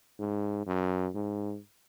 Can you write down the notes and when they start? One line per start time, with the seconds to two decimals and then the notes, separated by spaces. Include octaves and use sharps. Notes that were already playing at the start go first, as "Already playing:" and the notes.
0.19 G#2
0.66 F#2
1.15 G#2